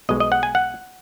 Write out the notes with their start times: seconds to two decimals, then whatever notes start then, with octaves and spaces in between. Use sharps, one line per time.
0.09 B1 B2 G#3 D#5
0.20 D#5
0.32 F#5
0.43 G#5
0.55 F#5